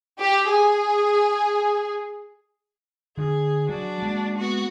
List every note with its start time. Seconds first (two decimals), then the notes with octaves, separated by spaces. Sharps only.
0.20 G4
0.50 G#4
3.17 D3 G#4
3.69 F#3 D4 F#4
4.02 G#3 A#3
4.38 B3 F#4